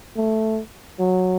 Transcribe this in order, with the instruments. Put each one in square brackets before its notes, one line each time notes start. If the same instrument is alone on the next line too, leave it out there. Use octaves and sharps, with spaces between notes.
[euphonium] A3
F#3